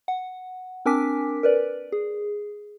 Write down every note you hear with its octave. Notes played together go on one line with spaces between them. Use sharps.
F#5
C4 D4 A#4 G#5 D6 B6
A#4 B4 D5
G#4